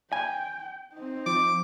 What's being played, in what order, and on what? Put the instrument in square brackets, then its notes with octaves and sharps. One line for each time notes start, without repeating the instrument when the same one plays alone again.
[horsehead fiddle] G5 [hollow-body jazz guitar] G#5
[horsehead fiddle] C4 D#4
[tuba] F3 [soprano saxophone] D6